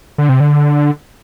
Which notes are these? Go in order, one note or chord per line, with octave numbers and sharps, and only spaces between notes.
D3
C3
D3